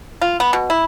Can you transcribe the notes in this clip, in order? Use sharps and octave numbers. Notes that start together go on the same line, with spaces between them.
F4
B3
B2
E4